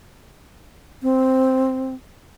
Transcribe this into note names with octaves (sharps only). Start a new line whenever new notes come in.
C4